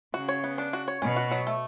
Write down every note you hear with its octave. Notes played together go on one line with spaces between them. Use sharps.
C#3 F#4
C#5
B3
D4
F#4
C#5
B2 C#4
F#4
F#3
A3